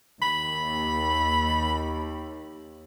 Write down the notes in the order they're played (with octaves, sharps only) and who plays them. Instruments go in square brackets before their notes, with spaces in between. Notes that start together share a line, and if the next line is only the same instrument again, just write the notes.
[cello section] D#2 [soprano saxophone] B5